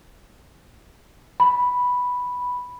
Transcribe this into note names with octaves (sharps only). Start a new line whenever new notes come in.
B5